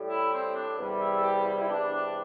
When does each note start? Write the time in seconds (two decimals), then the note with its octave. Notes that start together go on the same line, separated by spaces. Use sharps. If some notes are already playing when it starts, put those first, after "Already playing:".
Already playing: A2 G3
0.08 E4
0.31 C4
0.54 D4
0.77 E2 C3 G3
0.99 E4
1.14 A4
1.21 G4
1.45 E4
1.59 E4
1.67 E2 C3 G3 D4
1.90 D4